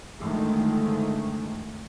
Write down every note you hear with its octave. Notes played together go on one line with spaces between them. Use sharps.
F#2 D3 D#3 F3 G#3 A3